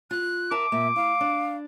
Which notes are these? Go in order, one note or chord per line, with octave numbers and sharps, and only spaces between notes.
F4 F#6
A#4 E5 A5 D6
A#2 A#3 E5
E4 F5
D4